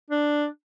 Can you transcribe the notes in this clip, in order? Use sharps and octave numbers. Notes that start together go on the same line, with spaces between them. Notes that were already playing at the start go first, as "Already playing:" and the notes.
D4